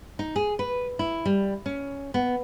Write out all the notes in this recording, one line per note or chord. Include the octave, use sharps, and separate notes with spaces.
D#4
G#4
B4
E4
G3
C#4
B3